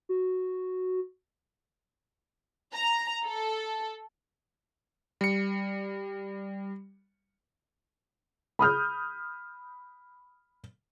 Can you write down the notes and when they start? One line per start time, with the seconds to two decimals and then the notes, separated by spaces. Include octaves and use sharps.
0.09 F#4
2.74 A#5
3.26 A4
5.21 G3 C#7
8.59 B5 D#6 F6 G6